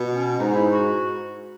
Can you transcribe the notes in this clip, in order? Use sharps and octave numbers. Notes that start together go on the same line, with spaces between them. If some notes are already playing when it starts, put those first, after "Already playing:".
Already playing: B2
C#4
G#2 D#4
E4
F#4